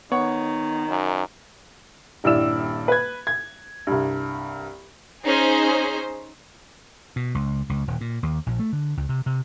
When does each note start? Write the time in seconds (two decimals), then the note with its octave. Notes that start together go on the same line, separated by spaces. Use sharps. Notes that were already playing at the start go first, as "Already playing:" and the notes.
0.12 D#3 B3 C#5 F#5 C#6
0.89 F#2
2.24 D#1 G2 E4 D5 E6 E7
2.88 B4 G#6
3.27 G#6
3.87 C2 G2
5.25 C#4 D#4 G#4 C5
7.16 B2
7.35 C#2
7.69 C#2
7.87 D#1
8.01 A#2
8.23 D#2
8.46 A#1
8.59 A3
8.73 D3
8.97 C#2
9.09 C3
9.26 C3